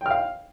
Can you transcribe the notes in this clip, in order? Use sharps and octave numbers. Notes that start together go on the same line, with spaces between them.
F5 G5 F6